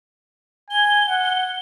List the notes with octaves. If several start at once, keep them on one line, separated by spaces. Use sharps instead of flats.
G#5 G7
F#5